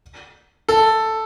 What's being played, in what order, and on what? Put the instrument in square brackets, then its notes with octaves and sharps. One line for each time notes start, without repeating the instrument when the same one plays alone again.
[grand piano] A4